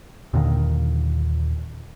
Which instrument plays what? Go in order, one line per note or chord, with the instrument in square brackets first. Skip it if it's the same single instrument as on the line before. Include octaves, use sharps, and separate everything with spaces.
[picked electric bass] D#2 A#2 D3 D#3